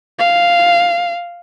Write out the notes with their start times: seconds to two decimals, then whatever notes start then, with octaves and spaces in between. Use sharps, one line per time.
0.19 F5